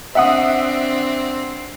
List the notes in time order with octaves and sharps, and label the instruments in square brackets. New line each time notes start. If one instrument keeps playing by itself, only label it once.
[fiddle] C4 D4 [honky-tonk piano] E5 F#5 D#6